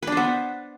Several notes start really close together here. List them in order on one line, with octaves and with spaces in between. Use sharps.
B4 D4 C5 B3